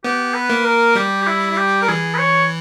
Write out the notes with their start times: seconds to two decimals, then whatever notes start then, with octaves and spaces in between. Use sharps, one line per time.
0.04 B3 G4
0.34 B4
0.50 A#3
0.65 A#4
0.95 G3 G4
1.22 G4
1.26 E4
1.51 E4
1.57 G4
1.82 A#4
1.88 E3 G#4
2.14 B4
2.19 C#5